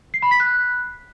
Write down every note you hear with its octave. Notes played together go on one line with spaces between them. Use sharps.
C7
B5
B6
F#6